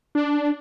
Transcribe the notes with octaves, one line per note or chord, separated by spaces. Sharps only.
D4